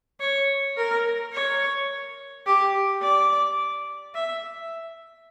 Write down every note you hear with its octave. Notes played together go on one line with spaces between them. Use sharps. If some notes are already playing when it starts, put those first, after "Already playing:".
C#5
A#4
C#5
G4
D5
E5